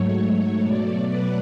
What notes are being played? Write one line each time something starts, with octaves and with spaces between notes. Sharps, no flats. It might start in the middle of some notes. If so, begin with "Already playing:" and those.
Already playing: G#2 F#3 A3 C#5
B2 F#3 A3 D5
B4